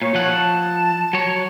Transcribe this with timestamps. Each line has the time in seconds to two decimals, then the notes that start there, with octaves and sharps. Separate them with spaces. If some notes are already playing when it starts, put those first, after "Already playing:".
0.02 A#2 C#5
0.14 F3 F#5
0.31 A5
1.13 F#3 C#5